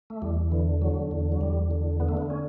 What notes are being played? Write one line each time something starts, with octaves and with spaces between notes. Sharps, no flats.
A3
E2 G3
D3 E3
D3 F#3
E2
F#3
E2 G3
D3
D3 B3
A3
B3
C#4